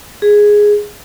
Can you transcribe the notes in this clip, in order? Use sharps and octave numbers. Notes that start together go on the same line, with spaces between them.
G#4